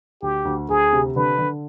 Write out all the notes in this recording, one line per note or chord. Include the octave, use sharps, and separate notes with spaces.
D2 G4
D2
D2 G#4
C3
D3 B4
D3